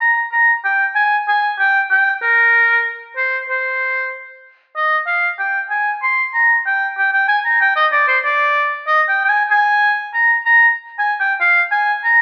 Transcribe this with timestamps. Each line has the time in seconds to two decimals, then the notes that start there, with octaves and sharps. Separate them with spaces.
0.01 A#5
0.32 A#5
0.65 G5
0.95 G#5
1.28 G#5
1.59 G5
1.91 G5
2.22 A#4
3.17 C5
3.49 C5
4.76 D#5
5.07 F5
5.39 G5
5.70 G#5
6.03 C6
6.34 A#5
6.66 G5
6.98 G5
7.13 G5
7.28 G#5
7.45 A#5
7.61 G5
7.76 D#5
7.92 D5
8.08 C5
8.25 D5
8.87 D#5
9.08 G5
9.25 G5
9.29 G#5
9.51 G#5
10.14 A#5
10.46 A#5
10.99 G#5
11.20 G5
11.40 F5
11.72 G#5
12.04 A#5